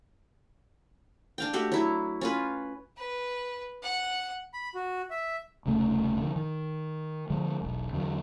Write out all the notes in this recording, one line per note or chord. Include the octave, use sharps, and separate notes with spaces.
D4 F5 G5
A3 F#4 G4
F#3 E4
C#4 F4 B4
B4
F#5
B5
F#4
E5
D#1 C2 C#3 A3
D3 F3
D#3
D3 F3 G#3
E1 B1
E2 D3 E3 F#3